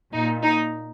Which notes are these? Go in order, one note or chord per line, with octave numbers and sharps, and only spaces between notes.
A#2 D#4
D#4